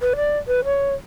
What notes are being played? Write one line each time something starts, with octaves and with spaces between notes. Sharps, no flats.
B4
D5
B4
C#5